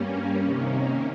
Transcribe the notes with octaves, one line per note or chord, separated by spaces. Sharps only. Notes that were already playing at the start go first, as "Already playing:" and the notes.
Already playing: G2 G3 A#3 C#4
C3 D#3 A#3 C#4